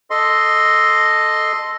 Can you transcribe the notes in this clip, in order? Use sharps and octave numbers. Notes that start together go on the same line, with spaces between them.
A4 D#5 C6